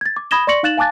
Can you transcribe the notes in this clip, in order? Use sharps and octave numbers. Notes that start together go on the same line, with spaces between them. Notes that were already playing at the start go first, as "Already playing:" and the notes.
G#6 A6
D6
B5 D#6 G#6 A#6 E7 G7
D5 C6 C#6 A#6 C#7 F#7
D#4 F5 F#6 A6 E7 F#7
F5 G#5 A5 D6 F#6 A6